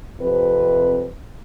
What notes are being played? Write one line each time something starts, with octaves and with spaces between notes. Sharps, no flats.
F2 C3 B4